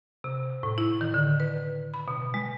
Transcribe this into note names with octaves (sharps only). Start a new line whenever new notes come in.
C3
A2
E4
D#3
D3
B4
B5
B2
G#3